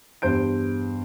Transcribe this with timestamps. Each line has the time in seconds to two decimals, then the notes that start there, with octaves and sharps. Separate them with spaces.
0.22 E2 G2 C5 G6 D7